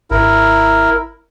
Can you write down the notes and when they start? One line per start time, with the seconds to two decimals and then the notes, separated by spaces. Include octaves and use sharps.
0.11 G#1 E4 A#4